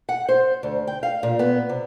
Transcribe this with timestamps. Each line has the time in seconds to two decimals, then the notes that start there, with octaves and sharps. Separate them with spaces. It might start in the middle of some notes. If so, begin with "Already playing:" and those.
0.09 F#5
0.29 C5
0.63 D2
0.87 G5
1.03 F5
1.23 A#2
1.39 B3
1.69 C3